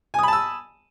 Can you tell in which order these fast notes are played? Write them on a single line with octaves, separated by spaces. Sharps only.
G#5 D#6 B5 A5 E6